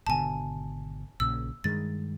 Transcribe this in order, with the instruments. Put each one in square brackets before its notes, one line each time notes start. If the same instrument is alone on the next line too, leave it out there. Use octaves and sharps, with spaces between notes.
[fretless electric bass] G#1 B2 D3 [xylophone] G#5 A5
[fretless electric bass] A#1 A#2 C#3 [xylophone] E6
[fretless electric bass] G2 D#3 G#3 [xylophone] A6